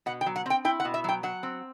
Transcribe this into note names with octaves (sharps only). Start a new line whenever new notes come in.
B2 F#5
G5
F#3
F#5
C4 G5
E4 G5
F#5
B2
E5
F#3 G5
F#3 F#5
C4